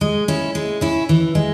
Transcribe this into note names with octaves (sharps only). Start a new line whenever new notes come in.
G#3
C#4 E4
G#3
C#4 E4
E3
G#3